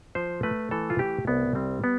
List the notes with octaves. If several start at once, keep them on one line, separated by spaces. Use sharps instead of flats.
F3 C5
A3 B4
E3 A4
F4
A3 G4
C2 B3
G3 C4
B3